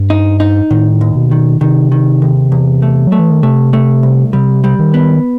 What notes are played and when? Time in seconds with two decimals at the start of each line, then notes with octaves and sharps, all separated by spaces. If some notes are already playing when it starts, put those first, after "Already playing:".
Already playing: G2
0.10 D#4
0.40 D#4
0.70 A2 D#3
1.01 D#2
1.15 B2
1.31 D#3
1.61 C3 D#3
1.92 D#3
2.22 D#2
2.52 E2
2.82 A3
3.07 F#3 A3
3.19 E3
3.31 D#3
3.43 C3 A3
3.73 A3
4.03 C2
4.33 C3 G3
4.64 G3
4.79 D#3
4.94 B3